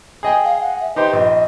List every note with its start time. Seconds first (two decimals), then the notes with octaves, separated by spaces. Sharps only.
0.23 G#4 D#5 G5
0.45 F5
0.61 F#5
0.81 E5
0.96 D#4 G4 B4 C5
1.13 A#1 D#5